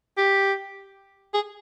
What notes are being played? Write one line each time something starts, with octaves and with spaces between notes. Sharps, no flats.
G4
G#4